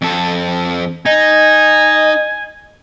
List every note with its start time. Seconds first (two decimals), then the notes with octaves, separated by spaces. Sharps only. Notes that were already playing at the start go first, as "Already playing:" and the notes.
0.02 F2 A4
1.06 D#4 D#5 G#5